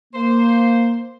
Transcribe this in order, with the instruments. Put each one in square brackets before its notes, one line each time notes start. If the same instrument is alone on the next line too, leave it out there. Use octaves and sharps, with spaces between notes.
[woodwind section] A#3 [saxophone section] C5